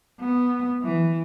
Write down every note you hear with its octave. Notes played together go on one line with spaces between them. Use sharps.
B3
E3